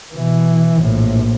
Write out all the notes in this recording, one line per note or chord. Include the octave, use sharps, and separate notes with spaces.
B2 E3
A#1 A2